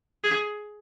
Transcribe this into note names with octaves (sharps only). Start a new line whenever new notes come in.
G#4